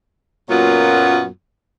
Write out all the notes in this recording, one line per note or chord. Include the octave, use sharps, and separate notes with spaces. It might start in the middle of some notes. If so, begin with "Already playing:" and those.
F#2 A#2 F#3 A#3 B3 F4